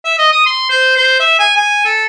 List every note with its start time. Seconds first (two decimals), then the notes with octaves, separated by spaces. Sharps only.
0.05 E5
0.19 D#5
0.32 D#6
0.46 C6
0.70 C5
0.97 C5
1.20 E5
1.39 G#5
1.56 G#5
1.85 A4